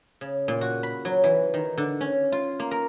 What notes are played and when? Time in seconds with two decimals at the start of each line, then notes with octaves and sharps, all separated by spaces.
0.21 C#3
0.48 A#2
0.61 F#4
0.83 B5
1.05 F#3
1.24 E3
1.54 D#3
1.78 D3
2.01 C#4
2.32 F4
2.60 A#3
2.71 A#4